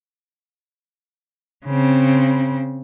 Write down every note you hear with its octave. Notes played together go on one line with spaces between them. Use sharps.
C#3 C4